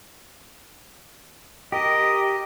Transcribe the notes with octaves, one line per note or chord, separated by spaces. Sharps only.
G4 A#4 D#5